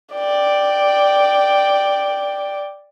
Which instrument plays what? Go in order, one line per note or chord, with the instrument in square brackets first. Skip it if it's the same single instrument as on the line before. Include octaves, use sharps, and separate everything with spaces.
[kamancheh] D5 G5